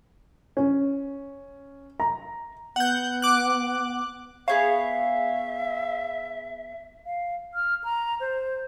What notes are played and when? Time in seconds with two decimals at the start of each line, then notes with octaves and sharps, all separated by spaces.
0.57 C#4
2.00 A#5
2.76 B3 F#5 G6
3.22 D6 F#6
4.48 B3 G#4 C#5 E5 F5
7.06 F5
7.54 F6
7.84 A#5
8.20 C5